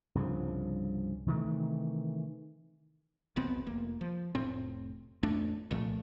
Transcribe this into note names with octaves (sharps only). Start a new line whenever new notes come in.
C2 G2 C#3 F3
C3 D#3 E3 A3
E1 B1 B3 C4
F1 A#3
F3
F1 A2 C4
A1 F2 A3 D4
C2 A#2 F3 A3